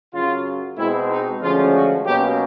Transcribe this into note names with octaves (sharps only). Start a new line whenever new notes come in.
F#2 C#3 F#3 F4
B2 G#3 C4 E4
D#4
D2 C#3 F3 G#3 C#4 F4
F#4
B2 F#3 A#3 C#4 G4